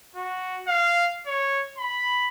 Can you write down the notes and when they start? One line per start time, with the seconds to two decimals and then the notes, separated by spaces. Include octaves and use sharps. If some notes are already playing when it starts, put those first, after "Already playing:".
0.15 F#4
0.67 F5
1.26 C#5
1.78 B5